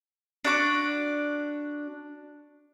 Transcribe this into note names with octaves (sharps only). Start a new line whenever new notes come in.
D4 F#4 D6